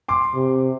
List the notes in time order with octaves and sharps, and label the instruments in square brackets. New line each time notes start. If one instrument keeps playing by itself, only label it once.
[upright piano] C6 D6
[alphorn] C3